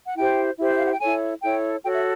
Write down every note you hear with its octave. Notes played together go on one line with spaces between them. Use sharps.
F#5
E4 G4 C5 G5
E4 G4 C5
E5
F5
F#5
G5
E4 A4 C#5 G#5
E4 A4 C#5 G5
F#4 A4 C#5 G5
E5